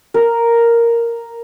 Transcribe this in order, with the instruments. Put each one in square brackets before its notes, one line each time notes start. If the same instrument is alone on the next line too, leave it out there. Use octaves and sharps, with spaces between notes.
[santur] A#4